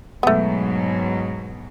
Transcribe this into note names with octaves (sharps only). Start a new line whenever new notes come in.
G#2 B2 F#3 A3 B3